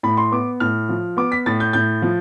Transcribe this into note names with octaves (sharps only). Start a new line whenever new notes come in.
A2 B5
C6
B3 D6
A2 F6
F3
B3 D6
B6
A2 A6
G6
A2 G6
F3